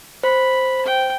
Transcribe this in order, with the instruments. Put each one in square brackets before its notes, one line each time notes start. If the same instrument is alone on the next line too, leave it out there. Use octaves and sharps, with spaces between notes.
[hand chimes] C5 [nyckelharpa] B5
[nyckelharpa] G5